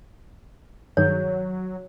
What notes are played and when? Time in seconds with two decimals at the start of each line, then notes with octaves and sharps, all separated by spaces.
0.97 G2 D#3 F#3 G#4 C#5